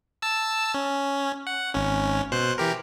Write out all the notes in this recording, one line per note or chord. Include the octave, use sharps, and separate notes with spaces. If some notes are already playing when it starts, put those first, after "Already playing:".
A5 E6
C#4
F#5
G#1 C#4
B2 C5 F#6
E3 G4 A#4